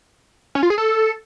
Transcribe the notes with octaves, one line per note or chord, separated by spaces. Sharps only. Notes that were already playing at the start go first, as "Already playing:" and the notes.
C#4
F4
G#4
A4